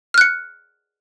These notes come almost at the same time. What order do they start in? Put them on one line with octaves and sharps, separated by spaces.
F6 F#6 C#7